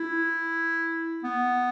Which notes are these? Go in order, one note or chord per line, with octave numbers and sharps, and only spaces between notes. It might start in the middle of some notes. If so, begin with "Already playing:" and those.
Already playing: E4
B3